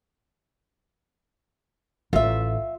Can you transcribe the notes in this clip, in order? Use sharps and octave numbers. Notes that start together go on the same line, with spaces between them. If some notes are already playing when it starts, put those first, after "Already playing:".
A1 F4 E5